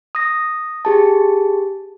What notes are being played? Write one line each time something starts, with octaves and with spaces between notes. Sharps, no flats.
D#6 A#6
G4 G#4 A5